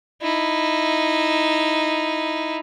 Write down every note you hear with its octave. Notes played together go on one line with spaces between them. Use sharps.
D#4 E4